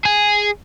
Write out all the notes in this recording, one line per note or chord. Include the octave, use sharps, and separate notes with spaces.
G#4